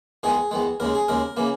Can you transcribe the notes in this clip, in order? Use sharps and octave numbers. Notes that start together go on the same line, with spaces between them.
E2 D#3 G#3 G#4
E2 D#3 G#3
D#2 C#3 G#3 A#4
G#4
D#2 C#3 G#3 A#4
C#3 E3 A#3